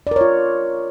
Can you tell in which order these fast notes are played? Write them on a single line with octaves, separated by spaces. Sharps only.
D5 A#4 C#5 F4